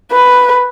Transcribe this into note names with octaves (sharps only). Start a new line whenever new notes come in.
B4